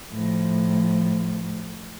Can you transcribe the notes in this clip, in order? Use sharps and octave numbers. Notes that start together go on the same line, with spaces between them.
A2 F3